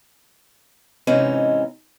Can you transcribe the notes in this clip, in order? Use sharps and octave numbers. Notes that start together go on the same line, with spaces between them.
G#2 C3 E3 C4 C#4 D#4